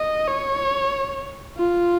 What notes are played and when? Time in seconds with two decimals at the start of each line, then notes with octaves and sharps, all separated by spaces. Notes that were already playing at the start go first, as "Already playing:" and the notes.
Already playing: D#5
0.28 C#5
1.57 F4